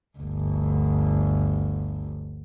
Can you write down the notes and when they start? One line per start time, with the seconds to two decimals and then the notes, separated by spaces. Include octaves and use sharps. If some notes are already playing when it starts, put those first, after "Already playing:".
0.18 G1 D2